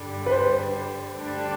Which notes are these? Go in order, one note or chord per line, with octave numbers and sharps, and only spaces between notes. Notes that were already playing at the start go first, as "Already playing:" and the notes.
Already playing: G2 D3 G3
B4
C5
D2 D3 G3 D4